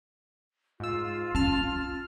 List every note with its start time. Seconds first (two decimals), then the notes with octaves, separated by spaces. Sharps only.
0.80 G#2 F4 E6
1.35 C#4 A5 F6